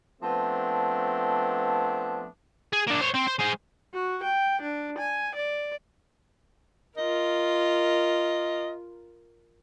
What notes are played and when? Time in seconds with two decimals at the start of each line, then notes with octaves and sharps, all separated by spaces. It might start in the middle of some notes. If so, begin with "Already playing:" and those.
0.22 F3 A3 B3 C4 D4
2.73 G#4
2.88 A#3 D4
3.01 C5 C#5
3.15 C4
3.28 C5
3.40 G#3 C5
3.94 F#4
4.24 G5
4.61 D4
4.98 G#5
5.35 D5
6.97 F4 A#4 D#5